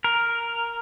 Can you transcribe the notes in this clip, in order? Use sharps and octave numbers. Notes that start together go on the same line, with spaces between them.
A#4